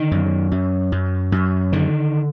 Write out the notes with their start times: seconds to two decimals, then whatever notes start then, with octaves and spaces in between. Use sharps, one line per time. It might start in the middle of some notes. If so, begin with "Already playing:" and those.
Already playing: D3 D#3
0.11 F#2
0.52 F#2
0.92 F#2
1.32 F#2
1.72 D3 D#3